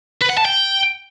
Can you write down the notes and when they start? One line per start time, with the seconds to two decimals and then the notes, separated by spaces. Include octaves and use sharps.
0.22 B4
0.30 F#5
0.38 A5
0.45 G5